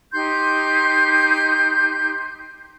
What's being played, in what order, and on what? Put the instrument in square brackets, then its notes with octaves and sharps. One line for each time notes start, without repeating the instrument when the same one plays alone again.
[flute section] D#4 G4 C6 G6